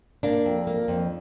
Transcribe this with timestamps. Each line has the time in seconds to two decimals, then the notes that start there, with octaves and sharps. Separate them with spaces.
0.23 A#3 D4
0.45 F2
0.67 A#3
0.88 F2